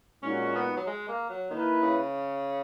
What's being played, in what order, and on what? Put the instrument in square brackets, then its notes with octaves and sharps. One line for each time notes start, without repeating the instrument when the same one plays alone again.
[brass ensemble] A#2 G#3 D#4 F#4 [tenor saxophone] C#4
[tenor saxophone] B3
F#3
G#3
A#3
F#3
[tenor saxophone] D#3 [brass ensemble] A#3 E4 B4
[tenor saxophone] C#3